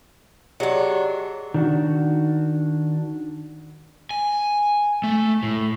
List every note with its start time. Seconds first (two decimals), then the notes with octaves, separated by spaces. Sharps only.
0.60 F#3 D4 G4 G#4 D#5
1.54 D#3 D4 F#4
4.11 G#5
5.04 A3
5.43 A2